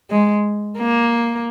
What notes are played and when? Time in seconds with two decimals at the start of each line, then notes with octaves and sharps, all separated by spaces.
0.10 G#3
0.78 A#3